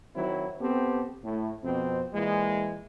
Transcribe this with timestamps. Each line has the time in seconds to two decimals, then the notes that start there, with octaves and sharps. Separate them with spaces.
0.15 D#3 F#3 C4 E4
0.61 B3 C4 G4 A4
1.24 A2
1.64 F2 B2 C4
2.13 A#2 E3 G#3